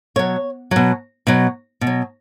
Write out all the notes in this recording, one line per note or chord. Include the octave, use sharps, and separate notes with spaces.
B2 F#3 C#5
B2 F#3
B2 F#3
B2
F#3